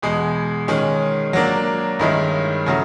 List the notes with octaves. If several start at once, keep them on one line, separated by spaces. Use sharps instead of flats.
E2 B2 G#3
D#3 G#3 C#4
F#3 A#3 D4
G2 D#3 G#3 C#4 E4
C#3 F#3 A3